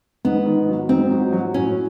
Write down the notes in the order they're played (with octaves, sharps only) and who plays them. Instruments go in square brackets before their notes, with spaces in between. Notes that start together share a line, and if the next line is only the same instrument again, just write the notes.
[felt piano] G#2 [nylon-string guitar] B3
[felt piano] D#3
F#3
[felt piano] G#2 [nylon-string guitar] C4
[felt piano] F#3
F#3
[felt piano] A2 [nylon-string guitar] C#4